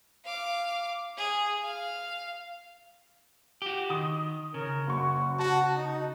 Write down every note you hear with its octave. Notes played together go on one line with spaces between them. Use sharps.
F5 D6
G#4
F5
F#4 G4
D#3 D#6
C#3 A#4
F#1 F#4 C#6
F#4 A5
D#4